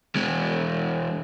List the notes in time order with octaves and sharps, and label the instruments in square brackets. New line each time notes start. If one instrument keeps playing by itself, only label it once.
[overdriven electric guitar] E2 G#3